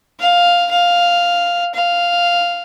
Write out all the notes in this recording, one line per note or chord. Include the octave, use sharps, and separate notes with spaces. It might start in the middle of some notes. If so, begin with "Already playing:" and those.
F5
F5
F5